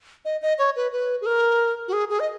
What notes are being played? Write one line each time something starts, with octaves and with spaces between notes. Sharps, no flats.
D#5
D#5
C#5
B4
B4
G#4
A#4
F#4
G#4
G#4
D#5